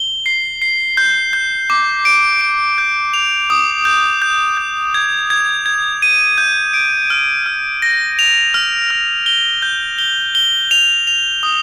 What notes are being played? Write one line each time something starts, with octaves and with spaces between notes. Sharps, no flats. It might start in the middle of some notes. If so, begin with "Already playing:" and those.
Already playing: G7
C7
C7
G6
G6
D6
D7
D7
G6
F7
D#6
G6
G6
G6
G#6
G#6
G#6
D#7
G6
D7
F6
F6
A#6
F7
F6
F6
G7
G6
G7
G7
F7
F7
D#6